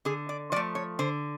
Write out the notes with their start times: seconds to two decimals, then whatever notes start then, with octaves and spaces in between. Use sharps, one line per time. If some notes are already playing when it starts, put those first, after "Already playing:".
0.05 D3 G#4
0.29 D5
0.52 F3 D5
0.56 A3
0.75 C#5
0.99 D3 C5